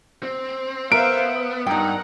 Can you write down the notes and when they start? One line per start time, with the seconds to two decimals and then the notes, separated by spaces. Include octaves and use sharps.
0.23 C4
0.92 B3 A#4 C5 E5 F5 D7
1.28 E5
1.67 G2 D#4 A#4 F#5 G5 A#5